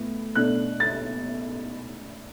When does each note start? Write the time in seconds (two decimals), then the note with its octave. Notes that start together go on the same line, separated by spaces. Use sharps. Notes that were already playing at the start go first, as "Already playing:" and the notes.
Already playing: A2 B3
0.35 B2 A3 D4 F#6
0.80 A6